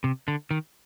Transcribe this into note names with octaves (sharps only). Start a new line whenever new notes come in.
C3
D3
D#3